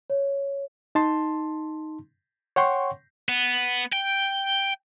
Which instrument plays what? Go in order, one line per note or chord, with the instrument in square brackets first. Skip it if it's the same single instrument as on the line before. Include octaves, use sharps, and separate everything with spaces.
[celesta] C#5
[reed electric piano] D#4 A5 C6
C#5 F#5 G5 C6 C#6
[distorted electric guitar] B3
G5